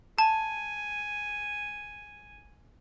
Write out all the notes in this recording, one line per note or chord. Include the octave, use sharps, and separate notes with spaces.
G#5 A5